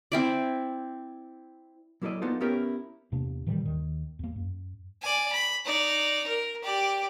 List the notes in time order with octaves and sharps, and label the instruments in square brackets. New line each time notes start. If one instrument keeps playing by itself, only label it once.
[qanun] C4 E4 D5
[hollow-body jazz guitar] F#3 A#3 E4 A4 D5 D#5
A#3 B3 D#4 F4 A4 C5
B3 C#4 E4 G4 A#4
[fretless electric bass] E2 C3 A#3 D4
A2 D#3 E3 G3
D#2 D#3
E2 A#3
F#2
[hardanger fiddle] D5 G#5
B5
D#4 D5
A#4
G4 D5